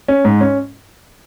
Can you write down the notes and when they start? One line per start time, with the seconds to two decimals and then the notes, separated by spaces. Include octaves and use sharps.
0.08 C#4
0.25 G#2
0.41 C#4